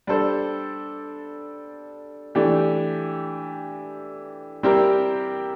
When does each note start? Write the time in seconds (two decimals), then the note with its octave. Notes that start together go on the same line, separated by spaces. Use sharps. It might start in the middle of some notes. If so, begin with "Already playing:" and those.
0.07 G3 D4 A4 C5
2.35 E3 A3 D4 G4
4.63 G3 C4 E4 G4 A#4